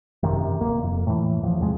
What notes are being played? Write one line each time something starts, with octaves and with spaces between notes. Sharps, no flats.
G#1 F#2 C3 D#3
D1 A#3
F2
A2 E3
A1 E2 F3
E2 C3 G#3